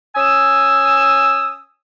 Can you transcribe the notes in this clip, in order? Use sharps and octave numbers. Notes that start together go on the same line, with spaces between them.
C#4 G#5 D#6 E6